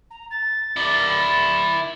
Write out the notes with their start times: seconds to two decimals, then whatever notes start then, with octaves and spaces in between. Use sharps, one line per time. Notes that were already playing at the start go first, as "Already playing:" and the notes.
0.10 A#5
0.30 A6
0.77 E4 D5